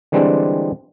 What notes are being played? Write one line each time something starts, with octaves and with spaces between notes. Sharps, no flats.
D3 E3 G3 G#3 C4 D4